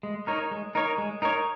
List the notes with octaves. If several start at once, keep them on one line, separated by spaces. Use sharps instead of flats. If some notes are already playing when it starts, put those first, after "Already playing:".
G#3
D#4 A#4 C#5
G#3
D#4 A#4 C#5
G#3
D#4 A#4 C#5